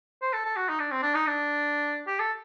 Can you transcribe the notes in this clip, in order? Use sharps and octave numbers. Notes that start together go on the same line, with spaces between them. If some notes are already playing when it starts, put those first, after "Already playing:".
C5
A4
A4
F#4
D#4
D4
C4
D4
D#4
D4
G4
A4